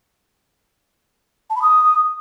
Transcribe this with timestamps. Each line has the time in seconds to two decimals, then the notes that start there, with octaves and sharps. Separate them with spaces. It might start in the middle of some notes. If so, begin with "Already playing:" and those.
1.50 A5
1.56 B5
1.62 D#6